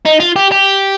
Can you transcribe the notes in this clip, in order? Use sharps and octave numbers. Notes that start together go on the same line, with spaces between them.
D#4
F4
G4
G4